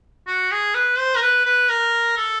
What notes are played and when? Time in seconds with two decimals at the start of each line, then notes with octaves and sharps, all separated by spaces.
0.27 F#4
0.51 G#4
0.75 B4
0.98 C5
1.16 A#4
1.22 B4
1.46 B4
1.69 A#4
2.17 A4